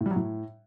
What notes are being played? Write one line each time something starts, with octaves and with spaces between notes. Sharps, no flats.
A2
G3
F#3
A2